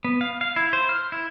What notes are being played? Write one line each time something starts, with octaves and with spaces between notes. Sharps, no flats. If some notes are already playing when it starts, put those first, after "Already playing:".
B3
F5
F5
E4
C5
F6
E4